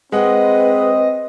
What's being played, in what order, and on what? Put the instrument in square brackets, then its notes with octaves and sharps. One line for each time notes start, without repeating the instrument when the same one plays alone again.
[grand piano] G#3 F#5 [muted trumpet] C4 [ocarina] B4 [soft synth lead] D#5